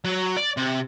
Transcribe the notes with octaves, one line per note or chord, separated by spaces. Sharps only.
F#3
D5
C3